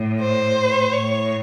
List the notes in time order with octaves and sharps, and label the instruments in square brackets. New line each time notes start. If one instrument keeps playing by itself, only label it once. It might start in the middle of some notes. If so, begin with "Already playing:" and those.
Already playing: [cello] A2
[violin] C5
[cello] A2 [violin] C#5